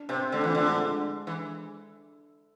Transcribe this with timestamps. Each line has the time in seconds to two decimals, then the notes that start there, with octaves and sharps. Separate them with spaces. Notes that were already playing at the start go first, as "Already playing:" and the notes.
Already playing: D4
0.09 C3 C4
0.32 D3 A3
0.44 E3 F3
0.55 D3 E3
0.68 G#3
1.27 E3